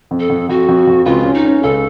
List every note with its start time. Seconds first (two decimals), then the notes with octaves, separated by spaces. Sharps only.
0.11 F2
0.20 A4
0.30 F2
0.49 F2 F#4
0.68 F2
0.87 F2
1.06 C#2 F4
1.25 C#4
1.34 D#4
1.45 C#4
1.63 C#2 A4